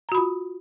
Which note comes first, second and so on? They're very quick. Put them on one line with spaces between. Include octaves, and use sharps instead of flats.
A#5 F#4 B5 F4